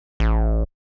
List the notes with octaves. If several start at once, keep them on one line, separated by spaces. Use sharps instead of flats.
A1